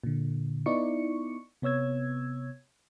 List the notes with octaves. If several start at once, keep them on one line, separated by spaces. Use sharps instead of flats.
A#2 D3
B3 D#4 E4 D5 C#6 C#7
C3 B3 C#5 E6 G#6